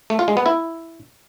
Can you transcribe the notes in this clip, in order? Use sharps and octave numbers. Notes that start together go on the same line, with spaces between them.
A3
F4
G#3
B3
E4